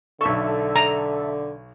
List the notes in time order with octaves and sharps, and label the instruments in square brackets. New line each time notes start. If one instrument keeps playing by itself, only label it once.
[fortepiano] B1 C#6 [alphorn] D3 [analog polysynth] A4 E5
[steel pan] A#5